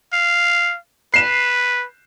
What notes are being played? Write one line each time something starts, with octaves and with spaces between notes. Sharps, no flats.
F5
B4 C7 E7